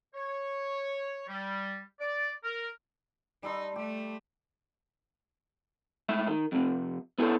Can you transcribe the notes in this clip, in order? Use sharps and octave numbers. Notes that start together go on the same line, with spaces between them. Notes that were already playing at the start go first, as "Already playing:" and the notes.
C#5
G3
D5
A#4
G3 D#4 A4 C6
A3 G4
G#2 A3 E5
D#3
F2 C3
B3 E4 G#4 A4 C#5